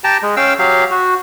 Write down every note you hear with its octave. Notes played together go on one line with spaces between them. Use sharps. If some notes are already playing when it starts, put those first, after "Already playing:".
G4 G5 A5 A#5
G#3
C#4 F5 G5 E6
F#3 G4 F5
F#4